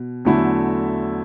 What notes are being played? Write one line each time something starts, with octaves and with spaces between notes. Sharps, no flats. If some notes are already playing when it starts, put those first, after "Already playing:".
Already playing: B2
E2 D3 F#3 A3 E4